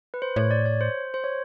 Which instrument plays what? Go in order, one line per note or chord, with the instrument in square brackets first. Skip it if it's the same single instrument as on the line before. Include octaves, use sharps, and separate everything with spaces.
[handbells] B4
C5
[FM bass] A2 [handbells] C#5
[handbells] D5
C#5
C5
C5
C#5